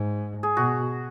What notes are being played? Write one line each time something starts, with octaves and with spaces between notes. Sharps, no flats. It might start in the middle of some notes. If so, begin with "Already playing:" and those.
Already playing: G#2
G#4
B2 F#4